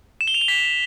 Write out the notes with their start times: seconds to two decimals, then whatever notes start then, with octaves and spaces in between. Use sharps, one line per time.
0.21 E7
0.28 G7
0.34 F7
0.41 G7
0.48 B6